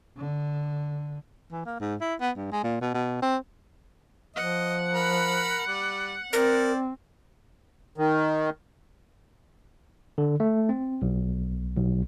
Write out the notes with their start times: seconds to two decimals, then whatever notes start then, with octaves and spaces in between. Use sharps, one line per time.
0.17 D3
1.51 E3
1.65 A#3
1.80 G#2
2.01 E4
2.20 B3
2.36 G2
2.52 G#3
2.64 A#2
2.81 B2
2.94 B2
3.22 C4
4.36 F3 D#5 F#5
4.93 A#4 B5
5.67 G3
6.33 C4 A#4 C5 D5
7.98 D#3
10.18 D3
10.40 A3
10.69 C4
11.02 B1
11.77 B1